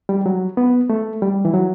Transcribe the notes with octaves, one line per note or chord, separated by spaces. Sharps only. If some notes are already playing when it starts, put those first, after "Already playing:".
G3
F#3
B3
A3
G3
E3
F#3